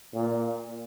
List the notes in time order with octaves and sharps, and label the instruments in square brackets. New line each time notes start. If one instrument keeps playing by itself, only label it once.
[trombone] A#2